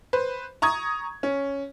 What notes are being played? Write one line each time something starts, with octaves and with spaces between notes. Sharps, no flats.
B4 C5
A#5 C#6 D#6 G#6
C#4